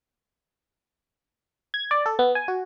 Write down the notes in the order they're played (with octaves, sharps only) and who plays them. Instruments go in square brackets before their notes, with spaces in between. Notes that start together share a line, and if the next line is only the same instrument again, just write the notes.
[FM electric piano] G#6
D5
A4
B3
G#5
F#4